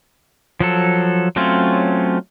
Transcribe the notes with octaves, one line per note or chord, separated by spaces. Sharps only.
F3 F#3 A4
F#3 A3 C4 C#4 F4